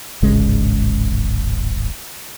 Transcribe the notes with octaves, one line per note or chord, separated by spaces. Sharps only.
D1 G#1 C#3 G#3